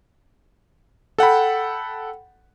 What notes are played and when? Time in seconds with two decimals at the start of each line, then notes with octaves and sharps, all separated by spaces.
1.18 A4 F#5 G5 B5